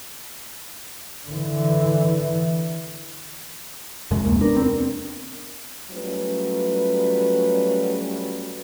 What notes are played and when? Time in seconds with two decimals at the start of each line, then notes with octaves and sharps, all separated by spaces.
1.28 D3 E3
4.11 F2 C3 G#3
4.26 D#2 A#3
4.41 B3 D4 A#4
4.56 C4
5.91 F#3 G3 A3 C#4 F4 B4